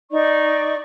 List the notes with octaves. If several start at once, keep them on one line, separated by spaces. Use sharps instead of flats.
D#4 D5 C#6